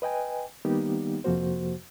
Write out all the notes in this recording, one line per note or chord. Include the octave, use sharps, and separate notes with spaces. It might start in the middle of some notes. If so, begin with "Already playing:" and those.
B4 D#5 G5 G#5
D#3 G3 A#3 B3 D#4 G4
F2 C3 F3 A#3 F#4 C5